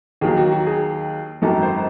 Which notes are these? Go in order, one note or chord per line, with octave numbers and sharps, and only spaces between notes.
D#2 D#3 F#3 G#4
F#4
F#4
G#4
G#1 F#2 D#3 A4
C5